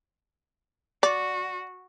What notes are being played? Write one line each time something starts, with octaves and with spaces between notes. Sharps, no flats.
F#4 D5